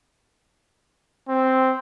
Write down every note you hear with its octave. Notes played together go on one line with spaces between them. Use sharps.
C4